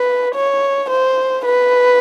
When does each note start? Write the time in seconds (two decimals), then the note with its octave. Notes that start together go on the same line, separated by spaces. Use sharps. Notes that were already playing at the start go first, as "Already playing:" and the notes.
Already playing: B4
0.35 C#5
0.90 C5
1.46 B4